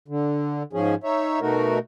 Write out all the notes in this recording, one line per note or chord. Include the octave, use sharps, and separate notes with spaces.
D3
G#2 F3 C#4 G#4
D#4 C#5 E5
B2 A3 D#4 F#4 A#4